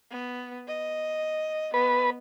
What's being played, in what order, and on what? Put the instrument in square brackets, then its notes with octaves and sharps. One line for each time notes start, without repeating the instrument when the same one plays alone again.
[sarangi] B3
D#5
[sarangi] B3 [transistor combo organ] B4